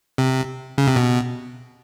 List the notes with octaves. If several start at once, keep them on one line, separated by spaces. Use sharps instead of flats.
C3
C#3
C3
B2